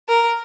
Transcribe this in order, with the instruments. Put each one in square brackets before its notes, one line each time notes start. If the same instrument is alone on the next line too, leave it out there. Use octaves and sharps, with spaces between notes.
[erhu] A#4